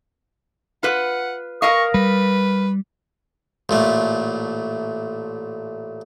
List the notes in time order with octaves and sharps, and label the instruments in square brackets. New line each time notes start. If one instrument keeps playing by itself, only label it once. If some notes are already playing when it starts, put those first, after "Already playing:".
[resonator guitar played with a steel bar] F4 B4 [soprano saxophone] F#5
[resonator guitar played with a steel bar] A#4 D#5 F5 [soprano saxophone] C#6
[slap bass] G3 [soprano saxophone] B4
[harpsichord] A1 A#2 A3